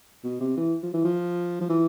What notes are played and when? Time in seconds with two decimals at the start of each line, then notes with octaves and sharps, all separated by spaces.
0.24 B2
0.40 C3
0.57 E3
0.83 F3
0.93 E3
1.04 F3
1.61 F3
1.70 E3